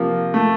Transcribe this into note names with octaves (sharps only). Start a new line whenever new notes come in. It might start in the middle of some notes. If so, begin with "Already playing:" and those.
Already playing: C3 F3 A#3
A3